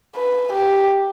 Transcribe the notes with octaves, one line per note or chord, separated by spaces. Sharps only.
B4
G4